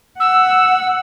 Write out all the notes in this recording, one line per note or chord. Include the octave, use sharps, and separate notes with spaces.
F#5 E6